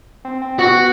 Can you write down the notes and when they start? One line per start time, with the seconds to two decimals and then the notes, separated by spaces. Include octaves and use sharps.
0.25 C4
0.42 C4
0.59 B3 F#4
0.77 B3